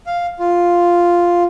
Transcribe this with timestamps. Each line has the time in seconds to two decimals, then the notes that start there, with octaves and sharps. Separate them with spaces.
0.06 F5
0.39 F4